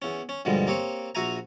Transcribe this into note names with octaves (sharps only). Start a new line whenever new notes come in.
E2 C#4
C#4
G2 B2 D3 F3 G3 G#3
A#3 C4 G4 C#5
A#1 F#4 E5 F5 G#5 A#5